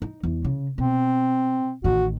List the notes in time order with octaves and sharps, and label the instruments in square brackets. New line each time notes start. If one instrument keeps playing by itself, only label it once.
[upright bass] D#4
E2 E3
C#3
[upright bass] B2 [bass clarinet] C4
[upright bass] A1 D#3 [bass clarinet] F#4